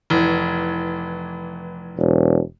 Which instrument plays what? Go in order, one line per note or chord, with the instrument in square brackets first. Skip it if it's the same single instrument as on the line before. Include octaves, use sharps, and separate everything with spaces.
[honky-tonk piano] F1 E3
[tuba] E1